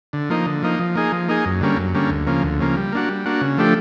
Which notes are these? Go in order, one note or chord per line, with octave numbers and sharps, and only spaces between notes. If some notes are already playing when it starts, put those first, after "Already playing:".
D3
F3 A#3 D#4
D3
F3 A#3 D#4
F3
A#3 D#4 G#4
F3
A#3 D#4 G#4
F#2
D3 G3 A#3 C#4
F#2
D3 G3 A#3 C#4
D2
C#3 F3 A#3
D2
C#3 F3 A#3
G3
A#3 D4 F#4
G3
A#3 D4 F#4
C#3
F3 A3 D4 G4